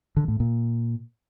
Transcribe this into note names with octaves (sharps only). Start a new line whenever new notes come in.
D3
A2
A#2